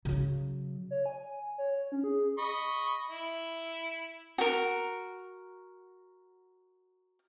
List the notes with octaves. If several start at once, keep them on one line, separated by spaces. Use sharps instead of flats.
C#3 F#3
C#5
G#5
C#5
C#4
G#4
D#5 B5 C#6
E4
F#4 A#4